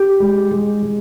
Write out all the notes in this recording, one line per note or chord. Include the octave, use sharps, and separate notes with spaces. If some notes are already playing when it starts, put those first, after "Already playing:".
Already playing: G4
G#3
G#3
G#3